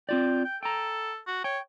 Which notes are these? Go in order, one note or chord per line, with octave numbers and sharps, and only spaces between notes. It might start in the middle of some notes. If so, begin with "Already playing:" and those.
C4 F4 D5 G5
G5
A4 G5 A#5
F#4
C#5 G5